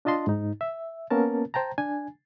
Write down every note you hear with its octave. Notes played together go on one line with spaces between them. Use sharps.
D4 F4 D#5 A5 C6
G#2 D#4
E5
A#3 B3 C#4 A#4 A5
C5 G5 A5 A#5
D4 G#5